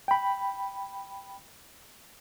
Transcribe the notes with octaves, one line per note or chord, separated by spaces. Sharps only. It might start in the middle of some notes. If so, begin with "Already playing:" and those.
G5 B5